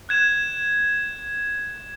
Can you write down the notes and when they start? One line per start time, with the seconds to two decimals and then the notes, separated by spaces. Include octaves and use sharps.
0.09 F#6 G#6 E7